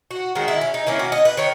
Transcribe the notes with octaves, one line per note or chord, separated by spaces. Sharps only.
F#4
D#3 G#3 C#4 F#4
E4
C#4
D#4
D#3 A#3 C#4 E4
F#4
D#5
B4
D#3 C#5